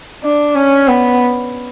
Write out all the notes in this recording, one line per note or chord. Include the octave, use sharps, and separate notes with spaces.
D4
C#4
B3